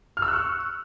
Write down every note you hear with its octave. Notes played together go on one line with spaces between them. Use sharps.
F6
E6
F#6
C#6